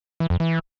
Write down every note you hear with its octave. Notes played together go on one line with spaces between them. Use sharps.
E3
F2
E3